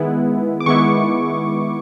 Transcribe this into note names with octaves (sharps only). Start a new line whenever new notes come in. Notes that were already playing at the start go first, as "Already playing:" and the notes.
Already playing: D#3 G#3 B3 E4
D6
D#3 G#3 B3 E4 C#6